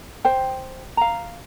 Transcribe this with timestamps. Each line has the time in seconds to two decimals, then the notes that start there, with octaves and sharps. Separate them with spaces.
0.25 C5 G5
0.97 F5 A#5